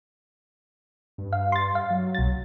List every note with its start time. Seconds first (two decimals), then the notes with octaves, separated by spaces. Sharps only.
1.18 G2
1.33 F5
1.52 C6 A6
1.75 F5
1.90 F#3
2.15 B1 A6